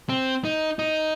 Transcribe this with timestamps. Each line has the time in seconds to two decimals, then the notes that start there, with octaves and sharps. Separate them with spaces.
0.09 C4
0.45 D#4
0.79 D#4